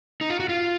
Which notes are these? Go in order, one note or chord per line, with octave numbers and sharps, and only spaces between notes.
D#4
F4
F#4
F4